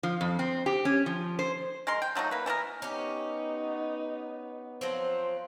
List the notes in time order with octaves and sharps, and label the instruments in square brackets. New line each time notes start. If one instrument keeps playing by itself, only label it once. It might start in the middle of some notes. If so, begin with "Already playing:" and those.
[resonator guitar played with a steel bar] F3
F2
C4
G4
C#4
F3
C5
[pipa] G#3 A#4 C6
G5
F3 F#3 A3 D#4
A#3 B4
E3 A3 B3 A#4
[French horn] B3 [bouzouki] C#4 G4 [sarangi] D#4
[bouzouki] F3 F#3 C4 [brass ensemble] C5